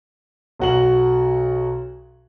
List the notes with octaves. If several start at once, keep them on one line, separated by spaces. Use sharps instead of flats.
B1 F#4 F#7